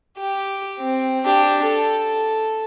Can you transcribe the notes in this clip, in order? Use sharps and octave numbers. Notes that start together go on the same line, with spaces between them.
G4
C4
D4 G4
A4